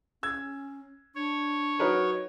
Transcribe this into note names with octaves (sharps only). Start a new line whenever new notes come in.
C#4 E6 G#6
D4 C#5
F#3 D#4 A#4 B4